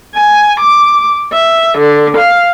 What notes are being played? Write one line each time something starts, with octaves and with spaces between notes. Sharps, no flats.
G#5
D6
E5
D3
F5